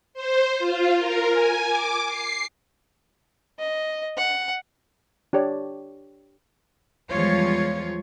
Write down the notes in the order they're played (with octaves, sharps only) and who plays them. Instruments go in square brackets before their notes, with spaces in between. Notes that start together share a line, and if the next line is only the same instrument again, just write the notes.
[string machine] C5
F4
A#4
G#5
D6
C7
[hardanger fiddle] D#5
F#5
[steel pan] D4 G4 C#5 D5
[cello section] E2 F3 G3 G#3 F4 C#5